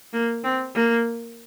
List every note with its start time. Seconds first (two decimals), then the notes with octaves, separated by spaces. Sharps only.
0.13 A#3
0.44 C4
0.75 A#3